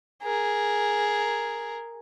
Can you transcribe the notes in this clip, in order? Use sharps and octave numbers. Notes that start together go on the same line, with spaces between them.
G#4 A#4